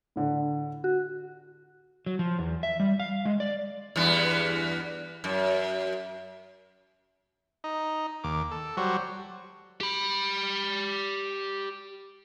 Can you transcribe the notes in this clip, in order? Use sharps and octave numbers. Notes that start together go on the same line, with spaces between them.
A2 D3
F#4
F#3
F3
E2
E5
G3
F5
G#3
D5
E2 G2 B3
F#2
D#4
D#2 D6
A4
F#3 G3 F#4 C5
G4 B5